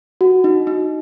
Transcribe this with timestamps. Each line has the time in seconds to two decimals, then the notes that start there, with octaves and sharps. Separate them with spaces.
0.21 F#4
0.44 D#4
0.67 D#4